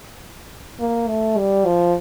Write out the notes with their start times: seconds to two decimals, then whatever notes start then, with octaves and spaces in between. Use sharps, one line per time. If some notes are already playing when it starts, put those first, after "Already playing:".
0.80 A#3
1.08 A3
1.37 G3
1.65 F3